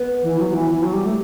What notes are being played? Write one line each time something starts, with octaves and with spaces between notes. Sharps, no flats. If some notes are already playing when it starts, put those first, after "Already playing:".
Already playing: B3
E3
F#3
F#3
E3
E3
F#3
G3
A3